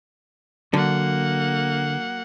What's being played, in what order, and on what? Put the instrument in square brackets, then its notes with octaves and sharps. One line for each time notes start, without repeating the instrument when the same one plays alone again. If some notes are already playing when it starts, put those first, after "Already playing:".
[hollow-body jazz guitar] D3 [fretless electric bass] F#3 [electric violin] A#3 F#5